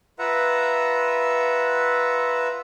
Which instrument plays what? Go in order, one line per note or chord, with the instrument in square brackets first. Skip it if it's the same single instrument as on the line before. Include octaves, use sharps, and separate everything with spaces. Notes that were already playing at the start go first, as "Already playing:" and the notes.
[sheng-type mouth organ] F4 B4 E5 F#5 A#5